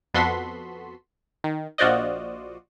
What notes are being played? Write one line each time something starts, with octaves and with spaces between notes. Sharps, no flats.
F2 B3 F#4 A4 C6 B6
D#3
A#1 F4 F#4 C5 D5 D#5